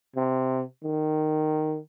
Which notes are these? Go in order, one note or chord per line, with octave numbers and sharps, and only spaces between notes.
C3
D#3